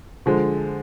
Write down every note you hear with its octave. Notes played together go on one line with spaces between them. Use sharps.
D3 F3 G#3